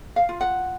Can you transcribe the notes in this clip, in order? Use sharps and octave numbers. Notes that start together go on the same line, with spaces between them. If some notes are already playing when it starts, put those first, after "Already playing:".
F5
F4
F#5